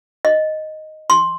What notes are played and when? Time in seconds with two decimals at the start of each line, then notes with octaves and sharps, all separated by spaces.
0.25 D#5
1.10 C6